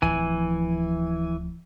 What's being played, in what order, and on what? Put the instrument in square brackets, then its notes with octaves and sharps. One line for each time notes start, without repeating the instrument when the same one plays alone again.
[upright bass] D1 F3 [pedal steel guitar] E3 G#5